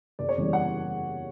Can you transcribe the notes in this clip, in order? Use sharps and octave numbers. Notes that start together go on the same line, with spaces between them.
F#1 D5
C#5
E2 C#3 E3 G3 D5
F#5